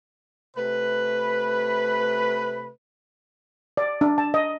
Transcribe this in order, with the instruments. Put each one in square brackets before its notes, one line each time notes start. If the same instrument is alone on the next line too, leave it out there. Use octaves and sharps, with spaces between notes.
[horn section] C3 A3 B4
[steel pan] D5
D4
A5
D#5